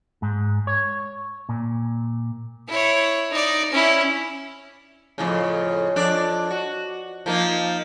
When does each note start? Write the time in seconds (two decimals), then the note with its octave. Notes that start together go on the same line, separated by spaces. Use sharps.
0.22 G#2
0.67 C#5
1.49 A#2
2.68 E4 C#5
3.31 D#4 D5
3.71 C#4 E4
5.18 F2 A2 C#3
5.96 F2 D4 D5
6.50 F#4
7.26 F3 A#3 D#4